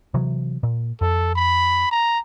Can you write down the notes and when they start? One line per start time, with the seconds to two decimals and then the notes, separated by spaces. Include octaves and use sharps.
0.14 C3 E3 F#3
0.63 A#2
1.01 F2 A4
1.35 B5
1.91 A#5